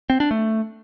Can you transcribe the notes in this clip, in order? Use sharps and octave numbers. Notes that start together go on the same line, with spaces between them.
C4
D4
A3